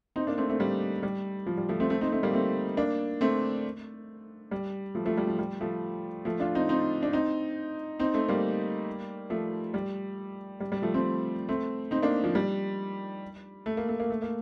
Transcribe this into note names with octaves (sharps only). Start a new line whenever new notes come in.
C4 D#4
A#3 D4
A3 C4
A3 C4
G3 A#3
G3
F3
G3
F3 A3
A3 C4
A3 C4
C4 D#4
A3 C4
G3 A#3
A3 C4
A#3 D4
A3 C4
G3
F3 A3
F3 A3
G3
F3
G3
F3 A3
F3 A3
D4 F4
C4 D#4
C4 D#4
D4
C4 D#4
C4 D#4
A3 C4
G3 A#3
F3 A3
G3
G3
G3
F3 A3
A3 C4
A3 C4
C4 D#4
A#3 D4
F3
G3
A3
A#3
A3
A#3
A3
A#3